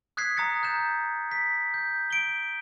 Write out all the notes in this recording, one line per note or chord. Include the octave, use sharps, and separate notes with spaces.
D#6 F#6 G#6 B6 C7
A#5 D#6 F#6 A6 C#7
A#5 F#6 G6 E7
B6
G6
D7 G7